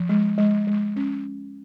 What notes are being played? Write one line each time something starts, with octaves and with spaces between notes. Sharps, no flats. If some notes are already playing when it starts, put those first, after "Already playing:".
Already playing: F3
G#3
G#3
G#3
C#4